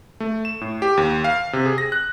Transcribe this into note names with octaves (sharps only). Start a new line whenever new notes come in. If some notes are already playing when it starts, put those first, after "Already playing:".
A3
E7
A2
G4
D#2
F5
C3
G#4
A#6
F#6